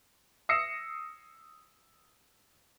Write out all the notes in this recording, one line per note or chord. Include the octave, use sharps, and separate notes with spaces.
D#6 E6 A#6 C7 C#7 E7